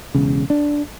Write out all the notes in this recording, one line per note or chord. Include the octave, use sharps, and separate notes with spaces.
E1 C#3
D4